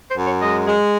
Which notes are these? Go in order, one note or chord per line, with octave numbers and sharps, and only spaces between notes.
C5
F#2
C#5
G#3 D#5
G#3